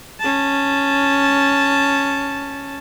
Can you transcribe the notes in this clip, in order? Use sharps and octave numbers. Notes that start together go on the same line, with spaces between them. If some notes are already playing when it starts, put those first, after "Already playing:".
C#4 A5